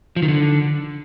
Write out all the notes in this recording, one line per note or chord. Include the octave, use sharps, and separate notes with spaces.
F3
D#3
D3